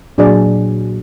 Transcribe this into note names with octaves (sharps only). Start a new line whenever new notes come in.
A#2 F#3 D4 G#4 D5